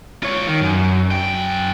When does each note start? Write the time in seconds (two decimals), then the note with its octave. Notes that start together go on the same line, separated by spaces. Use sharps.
0.23 F4 C#5
0.47 D#3
0.61 F#2
1.11 F#2 G5